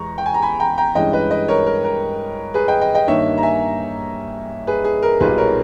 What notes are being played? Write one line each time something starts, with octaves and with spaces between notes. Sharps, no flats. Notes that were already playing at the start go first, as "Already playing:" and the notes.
Already playing: E2 G#3 A#5 C#6
G5
G#5
A#5
G#5 B5
G5 A#5
G5 A#5
G2 E3 G#3 C#4 D#5 G5
B4 D#5
B4 D#5
A#4 C#5
A#4
A#4
G#4 B4
D#5 G5
D#5 G5
D#5 G5
G2 D#3 A#3 D#4 C#5 E5
A#5
E5 G#5
G#4 B4
G#4
A#4
B1 A#2 G3 A#3 D#4 G#4 B4
A#4 C#5